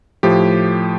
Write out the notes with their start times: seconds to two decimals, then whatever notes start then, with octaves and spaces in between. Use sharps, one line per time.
0.23 A2 F3 G4